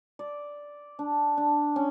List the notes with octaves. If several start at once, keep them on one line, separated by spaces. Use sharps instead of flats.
D5
D4
D4
C#4